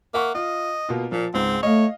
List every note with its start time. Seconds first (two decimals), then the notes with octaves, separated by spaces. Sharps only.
0.14 A#3 E5 F#5 C#6
0.35 F4 D#5
0.89 B2 A#3 F4
1.12 A#2 F3
1.34 C#2 G#2 C4
1.63 A3 C#5 D#5 F5